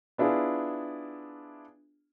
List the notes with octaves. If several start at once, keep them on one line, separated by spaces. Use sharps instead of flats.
B3 D4 E4 F4 G#4